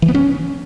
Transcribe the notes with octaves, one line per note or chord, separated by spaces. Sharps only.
E3
B3
C#4